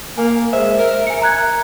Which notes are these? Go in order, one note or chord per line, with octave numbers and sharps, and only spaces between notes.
A#3 G#5
G#3 C5 E5
A#4
G#5 C#7
A#5 F#6 G#6